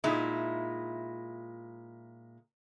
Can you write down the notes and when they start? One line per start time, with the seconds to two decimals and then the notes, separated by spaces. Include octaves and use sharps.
0.04 A#2 G#3 D#4 E4